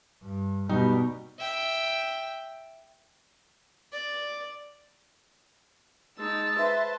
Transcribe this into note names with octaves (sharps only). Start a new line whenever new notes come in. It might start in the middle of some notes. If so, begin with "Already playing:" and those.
G2
B2 G3 D#4
E5 G5
D5
G#3 D#4 A5 E6
B4 C5 E5